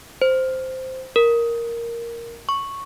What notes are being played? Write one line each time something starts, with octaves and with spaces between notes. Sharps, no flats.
C5
A#4
C#6